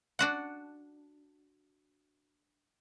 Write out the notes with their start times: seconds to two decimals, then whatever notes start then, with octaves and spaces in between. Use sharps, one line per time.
0.19 D4 F#4 F#5